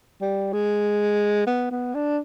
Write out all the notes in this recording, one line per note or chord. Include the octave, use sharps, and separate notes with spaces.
G3
G#3
B3
B3
D4